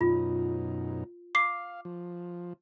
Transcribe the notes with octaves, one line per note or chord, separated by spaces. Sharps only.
F#2 B2 D#4 F4
F5 D6 C7
F3